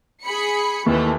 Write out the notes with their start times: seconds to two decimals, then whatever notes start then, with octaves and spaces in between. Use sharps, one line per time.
0.24 G#4 B5 C#7
0.86 D#2 E3 A3